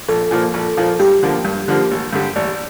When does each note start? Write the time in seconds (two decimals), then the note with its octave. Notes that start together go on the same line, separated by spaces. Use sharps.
0.09 A#1 A4
0.31 A#2 F3 A#3
0.54 A#1
0.77 A#2 F3 A#3
0.99 G2 G4
1.23 D3 F3 A#3
1.45 G2
1.68 D3 F3 A#3
1.91 A1
2.13 G2 D3 G3
2.36 A1 D5